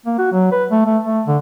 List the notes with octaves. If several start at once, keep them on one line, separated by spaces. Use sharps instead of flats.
A#3
F#4
F#3
B4
A3
A3
A3
D3